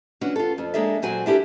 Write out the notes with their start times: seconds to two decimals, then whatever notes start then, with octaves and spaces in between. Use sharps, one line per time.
0.21 E3 C#4 D4 F#4
0.36 F4 A4
0.58 F2
0.74 G#3 A#3 D4 A4 E5
1.02 A#2 F#3 C4 F#4 G#5
1.26 D4 E4 G4 A4 A#4